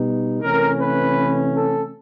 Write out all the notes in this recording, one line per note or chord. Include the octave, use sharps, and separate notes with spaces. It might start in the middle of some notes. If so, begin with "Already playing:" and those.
Already playing: B2 G3 B3 D#4
C3 E3 A3 C#4 A#4
B4
A4